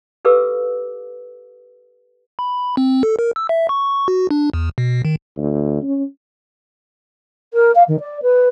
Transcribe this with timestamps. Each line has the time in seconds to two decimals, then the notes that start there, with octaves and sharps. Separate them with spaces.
0.25 G4 A4 B4 F5 D6 E6
2.39 B5
2.77 C4
3.03 A4
3.19 A#4
3.36 E6
3.49 E5
3.69 C#6
4.08 F#4
4.31 D4
4.54 E2
4.78 B2
5.05 D#3
5.37 D2
5.83 C#4
7.54 A#4
7.75 F5
7.88 D#3
8.00 D5
8.22 B4